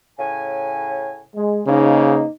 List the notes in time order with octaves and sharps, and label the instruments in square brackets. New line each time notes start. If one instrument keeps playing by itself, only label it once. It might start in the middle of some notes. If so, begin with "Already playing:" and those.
[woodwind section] A2 C#3 G#5
[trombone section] G#3
[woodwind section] E2 G#2 A#3 [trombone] C#3 [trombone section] D#4